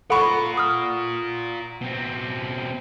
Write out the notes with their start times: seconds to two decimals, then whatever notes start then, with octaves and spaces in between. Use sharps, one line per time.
0.10 F4 A4 A#4 F#5 B5 C#6
0.57 D#6 F6
1.81 B2 C4